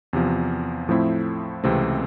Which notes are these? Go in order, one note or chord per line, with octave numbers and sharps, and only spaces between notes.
E2 C3 F3
A2 F3 A3 C4 E4
C#2 C3 E3 A3 C4